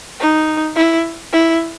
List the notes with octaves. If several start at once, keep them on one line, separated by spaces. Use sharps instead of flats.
D#4
E4
E4